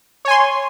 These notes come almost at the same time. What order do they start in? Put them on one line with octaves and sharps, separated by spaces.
C#5 G#5 C6